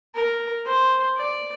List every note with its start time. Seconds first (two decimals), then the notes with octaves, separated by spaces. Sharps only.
0.14 A#4
0.65 C5
1.16 D5